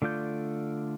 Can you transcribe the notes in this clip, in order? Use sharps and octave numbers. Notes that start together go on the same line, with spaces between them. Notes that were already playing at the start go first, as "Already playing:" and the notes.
D3 A3 F4 D5 G6